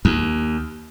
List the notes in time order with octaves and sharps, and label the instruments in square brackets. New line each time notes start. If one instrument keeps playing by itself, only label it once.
[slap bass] D#2